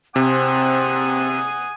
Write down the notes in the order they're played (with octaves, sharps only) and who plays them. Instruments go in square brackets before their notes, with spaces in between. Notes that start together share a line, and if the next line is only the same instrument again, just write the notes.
[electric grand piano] C3 [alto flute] C4 [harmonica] F#5 G#5 D#6